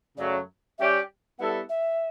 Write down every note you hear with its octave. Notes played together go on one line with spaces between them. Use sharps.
F#2 C#3 F#3 A3 D5
G3 C#4 G4 D5 E5
G3 B3 E4 A4 F#5
E5